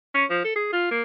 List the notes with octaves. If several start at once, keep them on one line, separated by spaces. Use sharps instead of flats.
C#4
F3
A4
G#4
F4
A#3